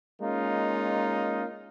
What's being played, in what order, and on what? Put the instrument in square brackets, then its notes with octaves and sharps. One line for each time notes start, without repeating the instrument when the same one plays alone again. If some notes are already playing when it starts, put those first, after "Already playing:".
[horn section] G#3 A#3 C#4 D#4 F4